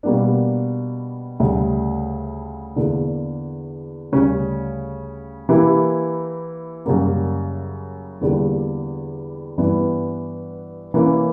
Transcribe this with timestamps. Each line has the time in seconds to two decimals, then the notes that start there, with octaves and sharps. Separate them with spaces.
0.03 B2 G3 A#3 D4
1.40 D2 C#3 G3
2.76 E2 D3 A#3
4.12 D2 C#3 G3 C#4
5.49 E3 A#3 E4 G4
6.85 F#2 C#3 G3 A#3
8.21 E2 D3 G3 A#3
9.58 G2 E3 B3
10.94 E3 A#3 C#4